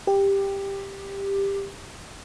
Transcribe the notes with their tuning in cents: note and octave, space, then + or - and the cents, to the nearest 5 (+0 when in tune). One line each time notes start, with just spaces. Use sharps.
G4 +10